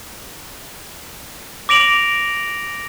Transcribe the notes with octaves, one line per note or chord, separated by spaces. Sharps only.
D6 A#6 D7 F7 F#7